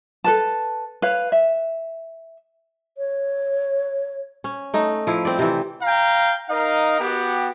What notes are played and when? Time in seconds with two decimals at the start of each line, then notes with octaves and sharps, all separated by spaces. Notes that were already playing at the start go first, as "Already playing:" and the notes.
0.24 A4 B4 A5
1.02 B4 C#5 F5
1.32 E5
2.98 C#5
4.44 C#4
4.74 A3 D#4
5.07 F3 E4
5.25 C4 D5
5.39 C3 E3
5.83 F5 G5 A#5
6.50 D#4 A#4 D#5 F5
7.00 B3 F#4 G4